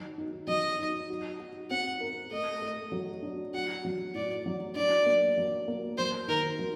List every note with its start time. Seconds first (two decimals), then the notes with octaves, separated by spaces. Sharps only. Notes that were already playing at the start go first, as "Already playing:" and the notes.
Already playing: D#3 F#3
0.18 D#4
0.47 F#3 D#5
0.79 D#4
1.10 F#4
1.39 F#4
1.71 C4 F#5
2.01 A#4
2.31 A3 D#5
2.62 A3
2.92 F#3
3.22 D4
3.54 F#4 F#5
3.85 F#3
4.14 A2 D5
4.46 F#3
4.75 D4 D5
5.06 A#3
5.37 F#3
5.68 A#3
5.98 F#3 C5
6.28 D#3 A#4
6.59 F#3